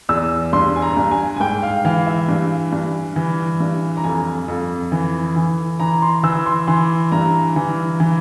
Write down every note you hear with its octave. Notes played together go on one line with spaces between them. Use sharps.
E2 E6
G2 C6
G#5
A#5
G2
G#5
G#5
G#2 G5
F5
E3 F5
E5
G2
G2
E3
G2
A#5
F2 G#5
F2
E3
E3
E3 A#5
C6
E3 E6
C6
E3 C6
G2 A#5
E3
E3